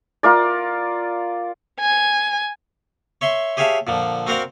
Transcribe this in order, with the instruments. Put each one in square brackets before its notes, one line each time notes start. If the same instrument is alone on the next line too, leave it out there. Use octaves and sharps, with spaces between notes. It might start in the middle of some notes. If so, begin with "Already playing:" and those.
[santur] F4 A#4 D5
[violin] G#5
[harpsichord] C#5 E5 C6 C#6
G4 G#4 C#5 E5 F5 A5
A#2 D3 F3
C4 F#4 A#4 C5 D5 F5